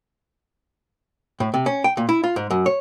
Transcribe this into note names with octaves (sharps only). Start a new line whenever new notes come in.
A2
C3
C#4
G5
A#2
E4
F4
G#2
F#2
C#5